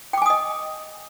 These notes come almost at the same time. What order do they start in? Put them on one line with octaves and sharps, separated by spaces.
G5 D6 G#5 D#6 D#5